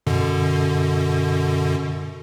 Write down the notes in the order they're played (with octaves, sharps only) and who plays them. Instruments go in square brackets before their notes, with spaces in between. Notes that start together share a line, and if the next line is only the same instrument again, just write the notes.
[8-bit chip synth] F#2 B2 D3